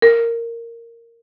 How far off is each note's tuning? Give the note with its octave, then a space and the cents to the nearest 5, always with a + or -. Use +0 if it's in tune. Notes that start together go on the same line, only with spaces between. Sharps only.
A#4 -10